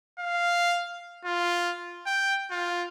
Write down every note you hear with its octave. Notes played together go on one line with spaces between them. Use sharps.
F5
F4
G5
F4